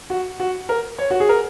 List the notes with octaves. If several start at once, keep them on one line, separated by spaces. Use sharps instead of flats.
F#4
F#4
A#4
C#5
F#4
G#4
A#4